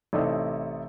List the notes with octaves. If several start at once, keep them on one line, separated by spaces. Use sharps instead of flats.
A1 C3 D#4 E4 A4 D5